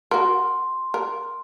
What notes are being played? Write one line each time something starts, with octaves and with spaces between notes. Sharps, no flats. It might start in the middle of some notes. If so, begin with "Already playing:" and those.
F#4 A#4 C6
A#4